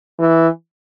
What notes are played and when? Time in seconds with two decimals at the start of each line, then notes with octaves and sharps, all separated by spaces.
0.19 E3